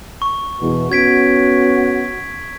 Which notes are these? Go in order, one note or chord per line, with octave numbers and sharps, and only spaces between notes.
C#6
E2 B2
B3 C#4 F#4 G#6 B6 D7